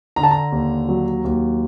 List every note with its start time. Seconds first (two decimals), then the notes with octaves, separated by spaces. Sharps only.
0.16 D3 A#5
0.23 A5
0.31 A#5
0.52 D#2
0.89 F#3
1.24 D#2